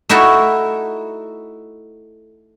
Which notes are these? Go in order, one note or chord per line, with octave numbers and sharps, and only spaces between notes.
A3 D#4 E4 F#4 A4